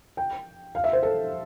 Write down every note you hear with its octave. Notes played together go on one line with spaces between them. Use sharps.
G5
F5
E5
C5
A4